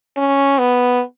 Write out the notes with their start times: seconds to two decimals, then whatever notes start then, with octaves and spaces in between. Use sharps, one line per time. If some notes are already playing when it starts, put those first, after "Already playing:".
0.17 C#4
0.58 B3